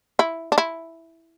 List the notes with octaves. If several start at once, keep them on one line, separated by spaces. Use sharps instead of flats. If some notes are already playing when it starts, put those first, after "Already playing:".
E4
D4
E4